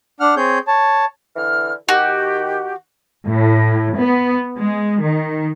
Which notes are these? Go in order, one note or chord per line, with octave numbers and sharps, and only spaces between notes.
D4 F#5 F6
C4 G#4 C#5 G6
C#5 A5
D3 E3 F6
D#3 F#4 G4
A2
B3
G#3
D#3